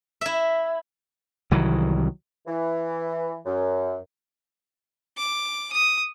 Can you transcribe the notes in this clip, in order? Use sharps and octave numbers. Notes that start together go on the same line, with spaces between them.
E4 E5
C2 D#3 E3 F#3
E3
F#2
D6
D#6